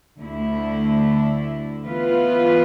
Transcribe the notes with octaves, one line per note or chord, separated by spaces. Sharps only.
D2 D3 A3 E4
E3 B3 F4 B4